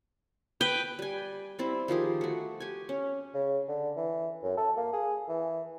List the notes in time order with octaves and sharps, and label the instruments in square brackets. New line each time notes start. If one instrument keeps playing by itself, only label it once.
[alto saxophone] B4 [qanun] G5
[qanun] G3 G#5
G3 C4 E4
D#3 F3 G4 G#4
A3 F#4
G4 G#5
C#4
[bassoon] C#3
D3
E3
F#2
A4
A#3
G#4
E3